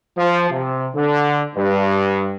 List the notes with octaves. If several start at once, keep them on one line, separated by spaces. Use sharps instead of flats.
F3
C3
D3
G2